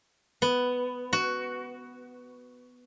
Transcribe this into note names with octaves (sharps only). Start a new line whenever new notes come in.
B3
F#4